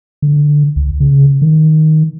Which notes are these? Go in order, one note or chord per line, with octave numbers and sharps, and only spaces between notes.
D3
C#2
C#3
D#3